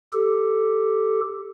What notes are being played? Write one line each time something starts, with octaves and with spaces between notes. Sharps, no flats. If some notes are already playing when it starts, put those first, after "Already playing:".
G4 A4